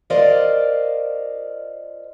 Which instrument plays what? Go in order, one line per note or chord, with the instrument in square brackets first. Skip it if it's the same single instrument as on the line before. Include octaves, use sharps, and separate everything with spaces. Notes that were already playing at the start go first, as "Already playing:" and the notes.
[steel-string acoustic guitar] F4 A#4 C5 D5 D#5 F5